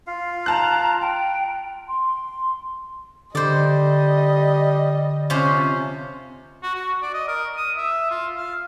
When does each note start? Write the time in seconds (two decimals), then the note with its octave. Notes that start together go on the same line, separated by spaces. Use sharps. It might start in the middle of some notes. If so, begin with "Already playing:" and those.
0.07 F4 F5
0.46 A5 A#5 F#6
1.01 G5
1.88 C6
3.35 D3 G3 A4 C5 D#5 D6
5.30 C3 F3 C#4 C5
6.63 F#4
6.75 F#4
7.02 D5
7.14 D#5
7.28 A#4
7.57 D#6
7.77 E5
8.11 F4
8.37 F5